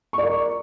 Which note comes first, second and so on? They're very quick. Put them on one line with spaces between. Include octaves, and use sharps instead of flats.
C#6 D5 A#4